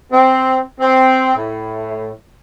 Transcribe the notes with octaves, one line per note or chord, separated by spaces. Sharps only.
C4
C4
A2